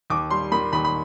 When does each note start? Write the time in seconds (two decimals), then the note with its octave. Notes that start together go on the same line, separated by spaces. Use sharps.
0.10 D#2 D6
0.31 G3 C6
0.52 D#3 B5
0.73 D#2 B5
0.85 B5